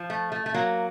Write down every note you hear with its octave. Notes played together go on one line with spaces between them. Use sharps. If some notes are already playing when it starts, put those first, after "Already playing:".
Already playing: F3
A3
A3
A3
F#3 A#3